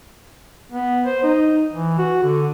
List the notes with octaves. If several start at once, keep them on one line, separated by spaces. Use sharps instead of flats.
B3
C5
D#4
E3
F#4
D3